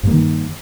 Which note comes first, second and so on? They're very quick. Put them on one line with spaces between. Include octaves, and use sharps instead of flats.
G2 A#3 D#3